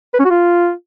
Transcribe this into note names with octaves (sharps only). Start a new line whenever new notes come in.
B4
C#4
F#4
F4